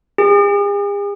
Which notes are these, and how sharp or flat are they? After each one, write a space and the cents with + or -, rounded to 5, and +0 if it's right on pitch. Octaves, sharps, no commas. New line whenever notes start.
G#4 -45